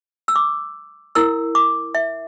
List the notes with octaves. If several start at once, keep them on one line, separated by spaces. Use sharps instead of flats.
E6
D6
E4 A#4 E6
D6
E5